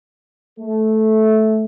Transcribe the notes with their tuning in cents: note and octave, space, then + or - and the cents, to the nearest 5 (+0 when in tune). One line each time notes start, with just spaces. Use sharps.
A3 -10